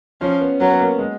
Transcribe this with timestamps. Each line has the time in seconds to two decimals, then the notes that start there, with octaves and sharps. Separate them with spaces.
0.21 F3 C#4
0.41 B3
0.60 F#3 B3
0.70 B3
0.80 A#3
0.99 G#3